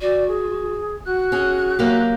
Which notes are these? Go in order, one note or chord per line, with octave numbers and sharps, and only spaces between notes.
F#4 D5
G#4
F#4 F#6
C#4 G#4
F#3 A#3 G4